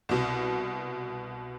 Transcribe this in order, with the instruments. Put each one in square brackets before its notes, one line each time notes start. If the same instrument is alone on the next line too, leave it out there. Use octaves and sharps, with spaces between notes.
[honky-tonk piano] C2 B2